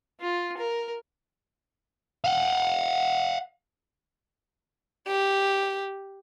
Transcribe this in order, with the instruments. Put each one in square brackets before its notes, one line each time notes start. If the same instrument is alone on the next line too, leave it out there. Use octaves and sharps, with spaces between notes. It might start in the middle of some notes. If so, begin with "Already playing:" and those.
[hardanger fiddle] F4
A#4
[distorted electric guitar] F5 F#5
[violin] G4